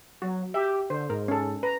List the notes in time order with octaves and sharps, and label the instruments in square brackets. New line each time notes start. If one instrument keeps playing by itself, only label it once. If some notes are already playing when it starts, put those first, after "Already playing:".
[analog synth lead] F#3 [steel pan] F#4
[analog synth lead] G4 [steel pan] E5
[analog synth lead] D3 [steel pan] C5
[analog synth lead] G#2 [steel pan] A#4
[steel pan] C#4 A4
[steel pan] B4 [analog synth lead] A#5